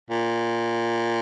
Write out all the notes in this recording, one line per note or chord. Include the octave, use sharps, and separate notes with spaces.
A#2